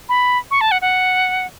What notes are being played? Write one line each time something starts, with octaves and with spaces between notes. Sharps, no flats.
B5
C#6
A5
F#5
F#5